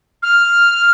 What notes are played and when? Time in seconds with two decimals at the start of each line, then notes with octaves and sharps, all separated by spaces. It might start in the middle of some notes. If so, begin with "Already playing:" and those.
0.23 F6